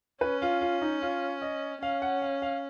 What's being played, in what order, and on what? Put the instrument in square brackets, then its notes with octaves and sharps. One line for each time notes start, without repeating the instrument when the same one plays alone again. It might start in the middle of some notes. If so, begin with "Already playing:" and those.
[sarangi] C#4 [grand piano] B4
[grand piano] F4
F4
D#4
F4
D#5
[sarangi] C#4 [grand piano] F5
[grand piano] F#5
F5
F5